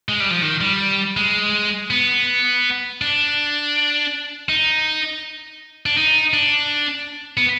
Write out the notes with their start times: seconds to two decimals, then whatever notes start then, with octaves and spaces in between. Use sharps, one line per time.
0.09 G#3
0.20 G3
0.31 F3
0.42 D#3
0.61 G3
1.17 G#3
1.90 B3
3.02 D4
4.49 D#4
5.86 D4
5.97 D#4
6.33 D4
7.37 B3